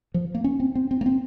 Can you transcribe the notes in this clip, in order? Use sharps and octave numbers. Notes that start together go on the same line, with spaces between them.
F3
A#3
C#4
C4
C4
C4
A#3
C4